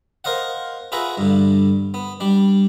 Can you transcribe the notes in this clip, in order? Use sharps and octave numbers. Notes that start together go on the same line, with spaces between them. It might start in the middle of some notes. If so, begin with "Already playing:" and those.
A#4 C5 D#5 F5 F#5
F4 G#4 B4 E5 F#5 A#5
G2 D3
B3
G3 D4